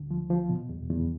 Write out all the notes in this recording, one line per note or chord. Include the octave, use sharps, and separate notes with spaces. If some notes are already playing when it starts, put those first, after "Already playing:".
Already playing: D2 D3
F3
F3
B2
E2
E2